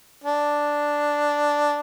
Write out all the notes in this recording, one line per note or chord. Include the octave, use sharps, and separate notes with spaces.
D4